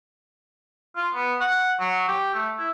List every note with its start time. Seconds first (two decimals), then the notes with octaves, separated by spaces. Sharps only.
0.96 F4
1.14 B3
1.41 F#5
1.80 F#3
2.08 G4
2.34 A3
2.58 E4